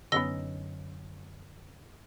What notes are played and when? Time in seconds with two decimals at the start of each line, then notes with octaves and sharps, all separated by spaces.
0.12 F#2 D3 B3 C#4 D#4 E6 A#6 G7